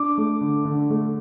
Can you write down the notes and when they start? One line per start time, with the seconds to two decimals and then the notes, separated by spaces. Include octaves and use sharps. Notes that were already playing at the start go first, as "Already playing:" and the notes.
Already playing: D4 D6
0.18 A3
0.41 D3
0.65 D3
0.90 A3